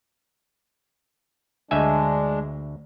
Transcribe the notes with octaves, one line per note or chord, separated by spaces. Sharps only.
D2 G#3 D4 E5 G#5